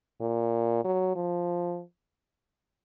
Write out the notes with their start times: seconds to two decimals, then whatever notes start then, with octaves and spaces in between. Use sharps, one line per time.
0.21 A#2
0.85 F#3
1.16 F3